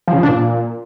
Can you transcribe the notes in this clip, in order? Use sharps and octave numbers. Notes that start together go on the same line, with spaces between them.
F3
C#3
F3
D4
A#2